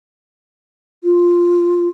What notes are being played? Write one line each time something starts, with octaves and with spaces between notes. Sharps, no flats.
F4